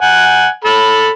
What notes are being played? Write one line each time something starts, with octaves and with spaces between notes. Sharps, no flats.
F#5 G#5
A4 B5